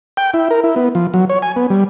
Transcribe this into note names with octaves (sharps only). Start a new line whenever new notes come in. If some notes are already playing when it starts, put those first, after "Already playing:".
G5
E4
A#4
E4
B3
F3
F#3
C#5
G#5
B3
G3